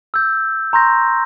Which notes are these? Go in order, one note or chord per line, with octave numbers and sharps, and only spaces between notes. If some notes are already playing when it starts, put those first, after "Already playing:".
E6 G6
A#5 C6 C#6 G6 A#6